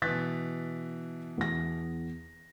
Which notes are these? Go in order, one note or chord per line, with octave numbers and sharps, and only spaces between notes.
B2 E3 F#6 A6 B6
E2 A#6